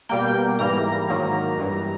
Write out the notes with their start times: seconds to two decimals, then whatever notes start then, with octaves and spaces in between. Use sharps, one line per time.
0.09 B2 G3 A#3 G5
0.59 G#2 E3 G3 A#3 A#5
1.08 G#2 D#3 F#3 A#3
1.58 G2 E3 G3